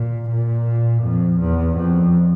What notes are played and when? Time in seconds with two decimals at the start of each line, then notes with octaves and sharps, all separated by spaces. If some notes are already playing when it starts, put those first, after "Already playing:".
Already playing: A#2
0.30 A#2
1.03 F2
1.40 E2
1.77 F2